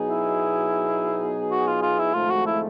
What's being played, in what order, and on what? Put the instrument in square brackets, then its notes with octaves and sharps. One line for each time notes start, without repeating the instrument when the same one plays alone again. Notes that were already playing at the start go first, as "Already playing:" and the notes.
Already playing: [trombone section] B2 F#3 B3 D#4 G#4
[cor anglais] E4
F#4
F4
F4
E4
[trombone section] G#1 G#2 F3 A3 [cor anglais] F4
[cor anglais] F#4
E4